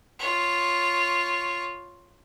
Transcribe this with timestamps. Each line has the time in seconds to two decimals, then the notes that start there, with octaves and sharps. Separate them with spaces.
0.20 F4 C#5